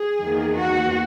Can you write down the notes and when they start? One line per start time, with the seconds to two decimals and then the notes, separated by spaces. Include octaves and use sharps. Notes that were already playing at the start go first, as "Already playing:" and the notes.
Already playing: G#4
0.19 E2 D#3 A#3
0.56 F#4